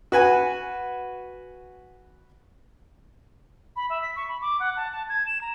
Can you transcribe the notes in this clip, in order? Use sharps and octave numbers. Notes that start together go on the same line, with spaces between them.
F#4 B4 G#5
B5
E5
B6
C#6
B5
D6
F#5
A5
A5
G#6
E7
A#5